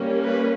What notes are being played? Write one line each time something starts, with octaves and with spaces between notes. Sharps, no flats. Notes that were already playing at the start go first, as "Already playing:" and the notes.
Already playing: G3 A#3 C#4
B4